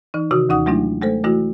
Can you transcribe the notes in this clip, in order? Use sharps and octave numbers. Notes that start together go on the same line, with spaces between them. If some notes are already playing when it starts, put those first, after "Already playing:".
E3 D#4
C3 D#3 F#4 D#6
D#2 E3 D#4 F#5 D#6
F#3 G#3 A3 D4 E4 F4
G#3 A3 A4 C5
E3 A3 E4 F#4